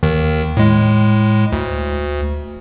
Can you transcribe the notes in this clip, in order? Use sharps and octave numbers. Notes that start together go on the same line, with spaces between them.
D#2 D#3
A2 G#3
D2